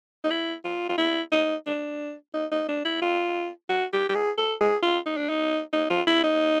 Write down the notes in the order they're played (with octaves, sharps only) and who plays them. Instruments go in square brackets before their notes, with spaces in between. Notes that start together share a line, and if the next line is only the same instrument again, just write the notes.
[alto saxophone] D#4
E4
F4
F4
E4
D#4
D4
D#4
D#4
D4
E4
F4
F#4
G4
G4
G#4
A4
G#4
F4
D#4
D4
D#4
D#4
F4
E4
D#4